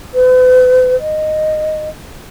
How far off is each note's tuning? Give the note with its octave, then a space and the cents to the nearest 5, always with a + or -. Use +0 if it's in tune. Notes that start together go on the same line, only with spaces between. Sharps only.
B4 +45
D#5 -10